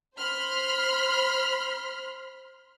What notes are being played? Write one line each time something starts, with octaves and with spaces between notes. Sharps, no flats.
C5 B5 C6 F6